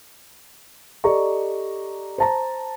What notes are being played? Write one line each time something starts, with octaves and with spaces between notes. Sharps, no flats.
G4 A4 D5 D#5 A#5 C#6
C5 A5 A#5